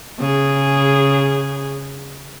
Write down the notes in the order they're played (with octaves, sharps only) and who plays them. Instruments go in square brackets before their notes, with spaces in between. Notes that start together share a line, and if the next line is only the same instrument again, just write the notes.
[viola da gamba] C#3 G#4